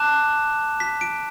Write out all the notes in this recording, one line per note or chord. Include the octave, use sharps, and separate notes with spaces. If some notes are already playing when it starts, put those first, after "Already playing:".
Already playing: A5 D6 F#6 E7
B6
D7